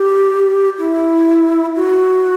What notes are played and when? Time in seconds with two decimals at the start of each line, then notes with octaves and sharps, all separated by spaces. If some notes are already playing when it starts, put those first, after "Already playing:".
Already playing: G4
0.79 E4
1.76 F#4